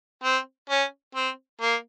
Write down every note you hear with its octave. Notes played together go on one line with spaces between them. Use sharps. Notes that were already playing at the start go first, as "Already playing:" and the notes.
C4
C#4
C4
A#3